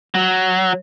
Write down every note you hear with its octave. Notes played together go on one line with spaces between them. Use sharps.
F#3